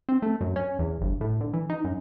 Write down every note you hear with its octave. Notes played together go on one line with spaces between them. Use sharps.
C4
A3
F#2
C#4
E2
G1
A2
D3
E3
D#4
F#2